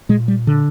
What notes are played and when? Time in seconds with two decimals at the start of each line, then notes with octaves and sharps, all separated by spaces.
0.09 A#2 G#3
0.28 G3
0.47 D3